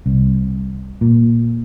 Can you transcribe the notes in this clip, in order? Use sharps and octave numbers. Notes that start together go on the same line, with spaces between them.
C2
A#2